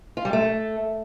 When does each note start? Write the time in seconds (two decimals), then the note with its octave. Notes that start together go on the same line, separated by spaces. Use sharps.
0.17 F4
0.25 G3
0.33 A3